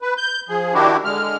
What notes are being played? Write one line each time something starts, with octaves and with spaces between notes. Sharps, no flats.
B4
G6
F3 G#4
D#3 D4 E4 F#4 G4
D3 G#3 F6